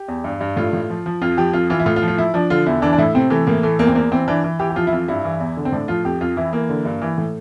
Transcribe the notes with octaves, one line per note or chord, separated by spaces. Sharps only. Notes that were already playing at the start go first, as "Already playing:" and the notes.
Already playing: G4
E2
G2
G2
A2 F4
A2
F3
F3
F2 F4
F3 G4
F2 F4
E3 F4
E4
A2 F4
F4
F3
F4
F3 E4
F3 D4
D3 F4
E2 E4
E3 D4
D4
A2 E4
C3 C4
E3 A3
A2 A#3
E3 A3
E2 A#3
C4
E2 A#3
E3 C4
E3 D4
E3
E3 G4
G4
F3 F4
E4
F2 F4
G2 E4
E3
E2
D3
C4
A2 D4
F3 F4
F2 G4
F2 F4
E3 E4
E3 A#3
D3
G2
E3
A2